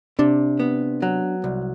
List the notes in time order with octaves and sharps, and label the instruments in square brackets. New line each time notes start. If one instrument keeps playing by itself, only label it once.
[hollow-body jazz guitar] C3 [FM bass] D4
[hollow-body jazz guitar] B3
F#3
C2